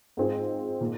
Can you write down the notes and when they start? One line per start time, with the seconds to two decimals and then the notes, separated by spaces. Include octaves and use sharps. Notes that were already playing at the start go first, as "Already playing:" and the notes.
0.17 G#2 G#3 C4 F4 G#4
0.81 A#2 A#3